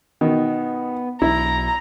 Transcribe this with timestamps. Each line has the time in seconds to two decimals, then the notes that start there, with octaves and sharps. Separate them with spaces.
0.21 B2 D#3 B3
1.22 B1 E4 A#5